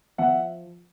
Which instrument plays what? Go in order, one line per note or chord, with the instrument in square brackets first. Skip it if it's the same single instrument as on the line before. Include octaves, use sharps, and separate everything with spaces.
[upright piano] F3 E5 F#5